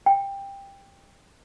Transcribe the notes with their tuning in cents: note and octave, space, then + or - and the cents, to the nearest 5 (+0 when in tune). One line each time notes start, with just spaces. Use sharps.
G5 +15